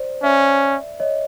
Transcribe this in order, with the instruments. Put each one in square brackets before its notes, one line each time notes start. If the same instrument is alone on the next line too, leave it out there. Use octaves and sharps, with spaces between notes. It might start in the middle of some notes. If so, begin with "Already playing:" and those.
Already playing: [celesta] C5 D5
[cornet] C#4 [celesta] D5 E5
[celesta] C#5 D#5